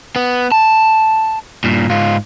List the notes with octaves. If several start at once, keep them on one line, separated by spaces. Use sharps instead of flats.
B3
A5
G2 A#2
G#2 F4